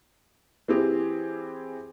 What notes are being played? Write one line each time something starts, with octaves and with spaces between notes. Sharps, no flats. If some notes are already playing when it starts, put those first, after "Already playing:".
E3 C4 G4 G#4